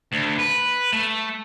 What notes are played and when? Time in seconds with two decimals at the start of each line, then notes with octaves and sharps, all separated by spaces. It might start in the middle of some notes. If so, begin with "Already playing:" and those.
0.12 D2
0.38 B4
0.92 A3